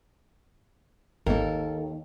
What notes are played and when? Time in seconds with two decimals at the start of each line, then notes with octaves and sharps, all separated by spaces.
1.27 G#1 D#2 A#3 A4 A#4